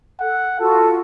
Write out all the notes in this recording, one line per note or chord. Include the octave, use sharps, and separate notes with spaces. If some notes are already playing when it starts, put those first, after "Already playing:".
A4 F#5
F4 F#4 A4